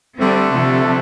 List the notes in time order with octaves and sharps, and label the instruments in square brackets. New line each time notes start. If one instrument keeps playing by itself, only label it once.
[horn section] D3 A3 D4 A4 [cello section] G3 C4
[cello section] C3 F3